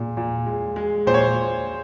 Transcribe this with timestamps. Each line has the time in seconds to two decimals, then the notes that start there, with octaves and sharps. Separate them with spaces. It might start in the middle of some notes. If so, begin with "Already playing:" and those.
Already playing: A#2 G#3
0.17 A#2
0.46 G#3
0.76 G#3
1.07 A#2 C5
1.14 C#5